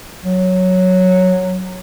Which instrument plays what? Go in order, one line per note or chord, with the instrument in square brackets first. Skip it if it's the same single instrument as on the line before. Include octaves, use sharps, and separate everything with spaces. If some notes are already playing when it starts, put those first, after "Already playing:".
[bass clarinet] F#3